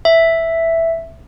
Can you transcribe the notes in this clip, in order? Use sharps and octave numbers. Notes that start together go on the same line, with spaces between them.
E5